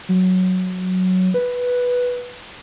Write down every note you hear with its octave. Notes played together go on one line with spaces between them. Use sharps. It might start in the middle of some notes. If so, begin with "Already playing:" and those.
F#3
B4